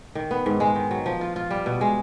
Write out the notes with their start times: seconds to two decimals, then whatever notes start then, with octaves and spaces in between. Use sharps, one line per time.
0.15 D#3
0.31 B3
0.46 G#2
0.60 G#3
0.76 D#3
0.91 F#3
1.06 F3
1.21 F4
1.36 F4
1.51 G3
1.66 B2
1.81 G#3